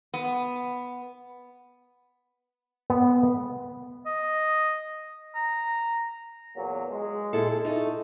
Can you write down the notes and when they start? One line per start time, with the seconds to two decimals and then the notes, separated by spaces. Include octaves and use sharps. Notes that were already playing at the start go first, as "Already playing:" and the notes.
0.14 B3
2.90 B3
4.06 D#5
5.35 A#5
6.56 E2 A#2 F#3
6.90 G#3
7.33 A#2 E4 A4
7.65 A3 D#4 A4